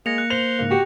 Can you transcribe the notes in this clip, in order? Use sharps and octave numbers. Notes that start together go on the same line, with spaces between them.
G#3 A#3 A#6 C#7 F7
F#6 A#6 C#7
C5 F7
G#2 C#3 A#3
F#4 G4